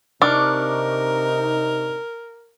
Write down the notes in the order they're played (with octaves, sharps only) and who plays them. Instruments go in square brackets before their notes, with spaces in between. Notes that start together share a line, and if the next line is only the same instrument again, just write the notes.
[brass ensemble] C3 D#4 [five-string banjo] D4 [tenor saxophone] A#4 [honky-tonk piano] C#6 D6 F6